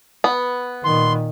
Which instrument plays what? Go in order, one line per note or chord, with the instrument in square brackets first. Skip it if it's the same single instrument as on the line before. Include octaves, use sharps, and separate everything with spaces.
[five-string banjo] B3
[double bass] A#2 D#3 [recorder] C6